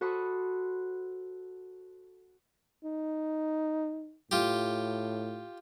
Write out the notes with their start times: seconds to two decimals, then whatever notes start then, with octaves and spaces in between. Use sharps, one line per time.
0.01 F#4 A4 C5 B5 C#6 D#6
2.84 D#4
4.31 A2 F4 G4